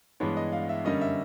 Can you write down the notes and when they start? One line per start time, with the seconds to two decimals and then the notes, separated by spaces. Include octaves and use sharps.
0.20 G2 E3 G#3 B3 D4 C#5
0.37 D#5
0.52 F5
0.69 E5
0.85 F#2 D3 G3 A#3 C#4 D#5
1.01 E5